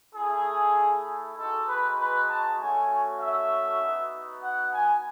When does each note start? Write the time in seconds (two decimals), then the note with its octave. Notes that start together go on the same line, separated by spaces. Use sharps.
0.15 A3 E4 G#4
1.37 G#3 D#4 F#4 A4
1.68 B4
1.98 B4
2.29 A5
2.59 A3 C#4 F#4 G#5
3.20 E5
3.81 B3 D#4 F#4
4.42 F#5
4.72 G#5